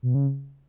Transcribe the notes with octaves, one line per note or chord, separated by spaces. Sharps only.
B2
C#3